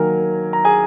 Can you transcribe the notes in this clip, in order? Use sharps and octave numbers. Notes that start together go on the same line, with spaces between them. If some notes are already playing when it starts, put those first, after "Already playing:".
Already playing: D#3 F#3 A#3 A#4 G#5 A#5
A#5
G#4 G#5